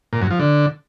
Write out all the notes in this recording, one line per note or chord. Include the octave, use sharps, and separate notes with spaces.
A#2
F#2
F3
D3